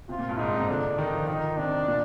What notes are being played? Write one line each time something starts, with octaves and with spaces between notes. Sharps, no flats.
C3 F4
A#2
G2
G#2 D#4
C3
C3
D3 D4
D#3 D#4
F3
D#3 D#4
C3 D4
A#2